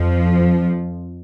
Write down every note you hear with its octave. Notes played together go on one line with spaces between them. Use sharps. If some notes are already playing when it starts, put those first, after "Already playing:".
Already playing: F2 F3